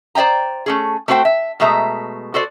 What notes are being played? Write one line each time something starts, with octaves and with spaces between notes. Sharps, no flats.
C5 D5 D#5 G5 A#5
A3 C#4 G#4
A3 C4 F#4 C5 G5
E5
B2 G#3 A3 E5 A#5
F#4 A4 C5 D5